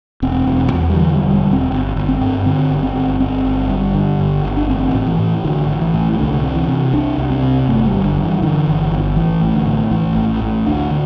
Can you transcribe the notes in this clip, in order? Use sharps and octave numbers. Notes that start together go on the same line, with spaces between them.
E1 C4
E1
E2
G3
D3 E3
G3
E1
G3
E1
C4
G1
G1
C4
G2
D3 C4
G1
C4
G1
G1 C4
G1
G2
D3
G1
G1
D4
A1 C4
A2
E3
A2
A1 D3
A1
E3
A2
E3
C2 D3
C3
E3
C3
C2 D4
C2
C4
C3
G1 A3
G3
G1
D3
G2
E3
D3 E3
G1
G1
A1 E3
A2
D3
A2
A1 E3
A1
A2
D2 D4
D3